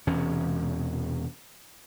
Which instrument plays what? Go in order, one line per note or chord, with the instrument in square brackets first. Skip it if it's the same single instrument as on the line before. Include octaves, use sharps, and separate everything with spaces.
[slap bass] E1 E2 C3 C#4